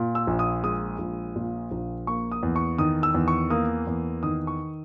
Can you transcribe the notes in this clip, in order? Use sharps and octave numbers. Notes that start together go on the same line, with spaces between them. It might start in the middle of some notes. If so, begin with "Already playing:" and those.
Already playing: A#2
E6
A#1
D#6
G#3 D#6
A#1
A#2
A#1
A#3 C#6
D#6
E2
C#6
D#3 D#6
E6
E2
C#6
A#3 D#6
E2
D#3 D#6
C#6